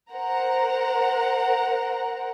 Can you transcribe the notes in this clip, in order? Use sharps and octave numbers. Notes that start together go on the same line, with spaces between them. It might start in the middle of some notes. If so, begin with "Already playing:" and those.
A#4 C5 F#5 A#5